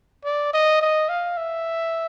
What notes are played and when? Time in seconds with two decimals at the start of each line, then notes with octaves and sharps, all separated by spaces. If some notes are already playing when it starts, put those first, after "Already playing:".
0.25 D5
0.53 D#5
0.81 D#5
1.09 F5
1.37 E5